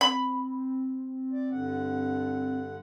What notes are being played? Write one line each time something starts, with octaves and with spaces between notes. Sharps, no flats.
C4 B5
D5
G2 D3 F#5